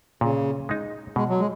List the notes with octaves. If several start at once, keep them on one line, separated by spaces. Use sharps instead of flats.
A#2 C#3
G#3 D#4
B2 G#3
F#3
G#3